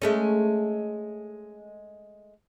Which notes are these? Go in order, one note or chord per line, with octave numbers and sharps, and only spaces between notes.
G#3 A3 C#4